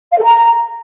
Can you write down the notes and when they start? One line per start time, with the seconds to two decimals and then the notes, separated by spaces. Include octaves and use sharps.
0.12 F5
0.18 A4
0.24 A#5